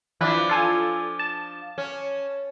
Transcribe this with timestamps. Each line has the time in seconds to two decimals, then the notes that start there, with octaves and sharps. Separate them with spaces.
0.21 E3 F3 D4 B4
0.49 F4 A4 G#5
1.19 A5
1.78 C#4